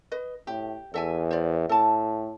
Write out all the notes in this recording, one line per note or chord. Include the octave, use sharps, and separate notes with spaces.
B4 D#5
A2 G4
E2 A4 E5 G#5
C5 D5
A2 A4 A5